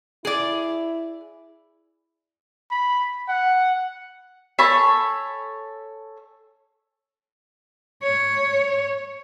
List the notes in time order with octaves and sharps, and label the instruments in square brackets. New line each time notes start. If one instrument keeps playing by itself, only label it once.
[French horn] E4 [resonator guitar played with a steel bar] G#4 D5
[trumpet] B5
F#5
[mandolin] A4 C#5 G#5 B5
[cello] C#5